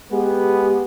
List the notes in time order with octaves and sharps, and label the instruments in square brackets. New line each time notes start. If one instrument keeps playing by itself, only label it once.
[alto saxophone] G#3 [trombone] B3 [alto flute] G4